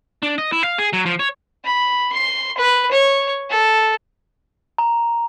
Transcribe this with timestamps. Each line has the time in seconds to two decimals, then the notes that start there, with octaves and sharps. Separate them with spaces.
0.23 D4
0.38 D#5
0.52 E4
0.64 F5
0.78 G#4
0.93 F#3
1.06 F3
1.19 C#5
1.64 B5
2.13 C6
2.58 B4
2.91 C#5
3.50 A4
4.78 A#5